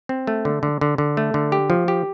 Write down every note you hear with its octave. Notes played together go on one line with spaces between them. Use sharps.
C4
A3
D3
D3
D3
D3
A3
D3
G4
F3
G4